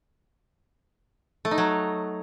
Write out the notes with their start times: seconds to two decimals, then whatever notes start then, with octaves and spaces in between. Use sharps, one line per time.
1.45 A3
1.51 D#4
1.58 F#3